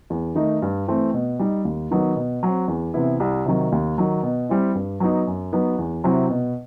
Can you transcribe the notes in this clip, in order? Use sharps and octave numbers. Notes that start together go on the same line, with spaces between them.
E2
D#3 A3 D#4
G2
E3 A3 C4
B2
G3 D#4
D#2
D#3 F#3 B3 D#4
B2
F#3 C4
E2
C3 E3 B3 E4
C2
C3 D#3 F#3
D#2
D#3 F#3
B2
G3 C4 E4
G2
F#3 B3 D#4
F#2
F#3 B3 D#4
E2
C3 F#3 C4 E4
B2